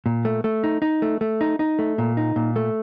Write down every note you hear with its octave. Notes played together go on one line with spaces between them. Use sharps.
A#2
A3
A3
D#4
D#4
A3
A3
D#4
D#4
A3
A#2
D#4
A#2
A3